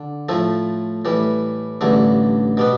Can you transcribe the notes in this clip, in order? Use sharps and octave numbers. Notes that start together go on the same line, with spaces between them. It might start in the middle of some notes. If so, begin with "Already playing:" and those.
Already playing: D3
A2 F3 A3
A2 E3 G3
A1 G2 D3 A3
B2 G3 B3